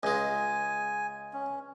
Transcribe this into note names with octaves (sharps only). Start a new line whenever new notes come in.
C#2 G#3 G#5
C#4